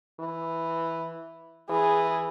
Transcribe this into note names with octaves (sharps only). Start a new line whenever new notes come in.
E3
E3 G#4